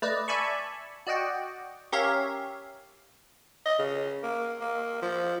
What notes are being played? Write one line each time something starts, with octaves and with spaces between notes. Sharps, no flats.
A3 B4 D5 D#5
D5 E5 G#5 A5 B5 C#6
F#4 D5 D#5 F#5 G5
C#4 G4 A#4 C#5 E5 F5
D#5
C#3
A#3
A#3
F3